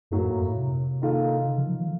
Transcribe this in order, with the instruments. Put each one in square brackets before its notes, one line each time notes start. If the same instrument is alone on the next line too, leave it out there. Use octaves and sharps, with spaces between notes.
[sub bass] F#2 [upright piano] A2 F#3 A#3
[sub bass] F2
F#2
A2
C3
[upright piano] D#3 A#3 F4 A4
[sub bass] C#3
F3
F3
D#3